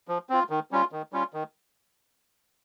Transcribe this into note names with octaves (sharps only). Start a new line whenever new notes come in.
F3
C4 F4
D#3
G3 C#4 F4
D#3
G3 C#4 F4
D#3